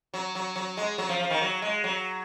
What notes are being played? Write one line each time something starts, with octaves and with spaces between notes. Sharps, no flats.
F#3
F#3
F#3
G#3
F#3
F3
F3
D#3
F#3
G#3
F#3